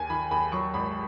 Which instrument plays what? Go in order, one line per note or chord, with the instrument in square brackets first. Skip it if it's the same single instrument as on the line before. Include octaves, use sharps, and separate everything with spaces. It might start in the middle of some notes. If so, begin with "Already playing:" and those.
Already playing: [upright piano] D#2 G#5
D#3 B5
D#2 B5
F#3 C#6
G#1 B5